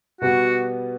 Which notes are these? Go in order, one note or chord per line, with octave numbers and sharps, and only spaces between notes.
B2 G3 B3 F#4